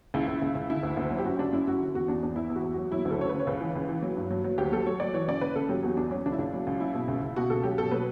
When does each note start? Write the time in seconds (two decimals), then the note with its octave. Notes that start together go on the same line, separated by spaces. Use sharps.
0.14 C#2 E4
0.28 C#2
0.42 C#2
0.55 C#2
0.70 D3 E4
0.83 D2
0.97 D2
1.11 F#3
1.18 G4
1.25 F#2 F#4
1.39 C#3 D4
1.52 F#2 E4
1.67 F#2 F#4
1.80 D3
1.94 E2 F#4
2.08 E2 D4
2.23 E2 D4
2.36 E2 E4
2.50 E2
2.55 F#4
2.64 E2
2.73 F#3 F#4
2.92 F#3 E4
3.05 D2
3.11 A4
3.19 C#3 C#5
3.29 C#3 B4
3.40 C#5
3.47 C#2 B4
3.61 E3
3.75 C#2
3.89 E3
4.02 F#3
4.17 G2
4.30 F#3
4.44 F#3
4.58 D2 G4
4.72 F#3 A4
4.86 F#3 C#5
5.00 F#3 D5
5.14 E3 C#5
5.28 C#3 D5
5.41 C#3 B4
5.56 C#3 A4
5.69 F#3 G4
5.83 E2 F#4
5.97 E2 D4
6.11 F#3 C#4
6.26 C#2 D4
6.32 E4
6.39 C#2 D4
6.53 F#3
6.67 C#2
6.80 F#3 E4
6.94 B2
7.08 C#2
7.22 C#2
7.36 B2 F#4
7.50 C#2 A4
7.63 F#3 G4
7.78 B2 A4
7.92 F#3 B4